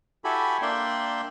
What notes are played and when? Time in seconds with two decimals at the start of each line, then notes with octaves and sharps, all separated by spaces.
0.24 E4 F#4 G4 A4 G#5 B5
0.62 A#3 D4 D5 E5 G5 C6